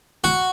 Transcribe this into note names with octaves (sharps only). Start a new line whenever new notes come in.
F#4